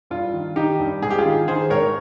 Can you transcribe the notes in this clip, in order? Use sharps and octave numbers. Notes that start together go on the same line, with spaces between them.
G2 F4
D#3
D#3 D#4 G4
G2
G#2 G#4
G4
F4 G#4
D#3
D#3 G#4 C5
G#2 A#4 C#5